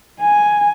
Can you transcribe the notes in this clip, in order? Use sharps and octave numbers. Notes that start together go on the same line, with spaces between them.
G#5